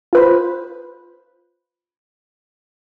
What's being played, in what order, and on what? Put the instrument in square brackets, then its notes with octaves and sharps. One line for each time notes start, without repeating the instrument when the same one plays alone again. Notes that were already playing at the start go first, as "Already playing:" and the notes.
[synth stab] F4 B4 C5